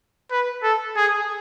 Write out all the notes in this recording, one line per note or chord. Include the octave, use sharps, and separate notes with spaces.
B4
A4
G#4